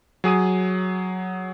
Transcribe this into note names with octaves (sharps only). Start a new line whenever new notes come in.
F#3 G#4 D#6 D#7